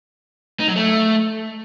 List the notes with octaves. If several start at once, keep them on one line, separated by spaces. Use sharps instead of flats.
D#4
F#3
A3